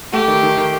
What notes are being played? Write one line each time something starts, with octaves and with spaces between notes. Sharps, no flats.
A3 G4
D#3
D#3
D#3